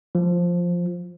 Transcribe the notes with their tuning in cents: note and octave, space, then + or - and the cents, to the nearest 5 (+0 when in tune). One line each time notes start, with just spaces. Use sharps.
F3 +5